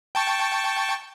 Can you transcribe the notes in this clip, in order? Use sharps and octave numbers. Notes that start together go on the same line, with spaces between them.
G5 A5 C#6